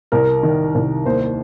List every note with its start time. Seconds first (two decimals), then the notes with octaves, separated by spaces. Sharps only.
0.12 C2 A#4
0.43 D#3
0.75 C2
1.05 D#2 C5